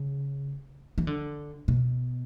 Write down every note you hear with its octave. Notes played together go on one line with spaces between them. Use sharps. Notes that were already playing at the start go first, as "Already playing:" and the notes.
Already playing: C#3
E3
D3
B2